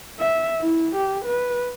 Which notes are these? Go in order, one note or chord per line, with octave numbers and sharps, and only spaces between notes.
E5
E4
G4
B4